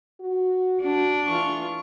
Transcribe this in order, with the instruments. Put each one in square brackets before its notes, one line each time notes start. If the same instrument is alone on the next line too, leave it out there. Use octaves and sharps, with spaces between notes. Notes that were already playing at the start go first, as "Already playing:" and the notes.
[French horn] F#4
[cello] D4 [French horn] F#4
[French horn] E3 [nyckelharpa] F4 C#6